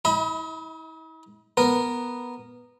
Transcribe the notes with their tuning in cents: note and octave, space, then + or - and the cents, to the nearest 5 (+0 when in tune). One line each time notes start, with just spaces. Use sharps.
E4 -40 D#5 +40 B5 +0
B3 -5 A#4 +0